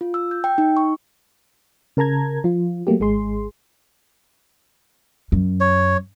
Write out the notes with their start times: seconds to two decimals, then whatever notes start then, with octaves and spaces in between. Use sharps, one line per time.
0.01 F4
0.14 E6
0.31 G6
0.44 G5
0.58 D#4
0.77 C#6
1.97 C#3 A#4 A5 A#5 G#6
2.44 F3 F4
2.87 F#3 A3 A#3 G4
3.00 G#1 G#3 G#4 C6
5.32 F#2
5.60 C#5